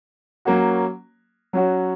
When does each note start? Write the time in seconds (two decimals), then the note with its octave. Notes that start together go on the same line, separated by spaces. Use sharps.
0.45 F#3 A#3 C#4 F#4
1.53 F#3 C#4 F#4